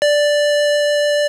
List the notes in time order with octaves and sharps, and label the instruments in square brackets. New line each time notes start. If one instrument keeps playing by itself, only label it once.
[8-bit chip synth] D5